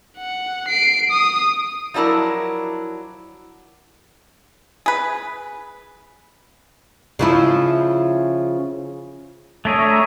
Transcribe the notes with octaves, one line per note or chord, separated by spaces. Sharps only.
F#5
C7 D7
D#6
F3 F#3 D4 E4 A#4
G#4 B4
C#3 F3 E4
A3 D4 G#4 C#5 E5 A#5